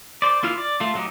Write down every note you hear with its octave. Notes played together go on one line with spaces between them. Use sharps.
C5 D5
A#3 E4 F4 F6
D5
A3 F4
F#3 A3 D#4 G4